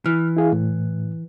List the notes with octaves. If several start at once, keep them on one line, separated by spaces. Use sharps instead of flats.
E3 F6
E4 G#4 F5
A2